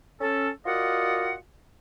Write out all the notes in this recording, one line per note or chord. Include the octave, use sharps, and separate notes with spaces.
C#4 A4
F4 F#4 A#4 D5 D#5 F#5